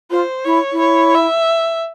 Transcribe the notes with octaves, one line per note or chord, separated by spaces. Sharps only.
F4 C5
E4 C#5
E4
C#5
E5